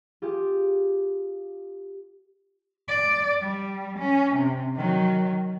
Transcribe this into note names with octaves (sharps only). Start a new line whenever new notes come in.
F4 G4 G#4
D5
G3
C#4
C3
D#3 F#3